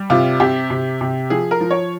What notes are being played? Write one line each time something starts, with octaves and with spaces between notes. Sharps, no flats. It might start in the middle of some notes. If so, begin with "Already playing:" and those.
Already playing: G3
C3 F4
C3 G4
C3
C3
F3 G#4
A#4
F3
C#5